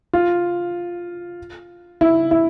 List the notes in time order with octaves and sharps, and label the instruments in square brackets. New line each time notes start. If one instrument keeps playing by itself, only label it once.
[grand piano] F4
E4
E4